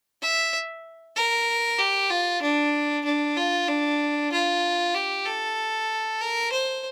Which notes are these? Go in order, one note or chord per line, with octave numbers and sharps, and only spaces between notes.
E5
A#4
G4
F4
D4
D4
F4
D4
F4
G4
A4
A#4
C5